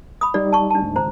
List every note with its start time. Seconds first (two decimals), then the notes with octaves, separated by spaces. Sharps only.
0.21 B5 D#6
0.34 G3 D#4 D5
0.52 A5 C#6
0.70 D4 A5
0.82 D2 G#2
0.96 G#1 C#2 C5 A#5